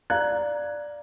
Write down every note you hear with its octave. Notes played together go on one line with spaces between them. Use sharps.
D5 F5 A#5 F#6 G#6